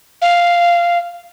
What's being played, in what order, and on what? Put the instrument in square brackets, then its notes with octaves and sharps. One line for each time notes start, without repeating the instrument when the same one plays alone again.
[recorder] F5